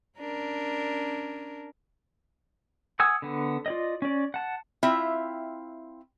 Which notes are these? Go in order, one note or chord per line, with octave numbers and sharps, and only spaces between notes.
C#4 D4 A#4
F#5 G#5 D#6 E6
D3 B3
F4 D5 D#5
C#4 D5
F#5 A5
C4 E4 F4 E5